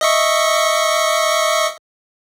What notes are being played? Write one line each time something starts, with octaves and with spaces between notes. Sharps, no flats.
D#5 E5 C#6